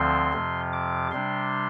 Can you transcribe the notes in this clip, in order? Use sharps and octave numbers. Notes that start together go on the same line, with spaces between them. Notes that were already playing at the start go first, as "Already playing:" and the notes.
Already playing: D2 D3 F3 C4 C6
F2 C3 F3
D6
C3 G3 D4 C6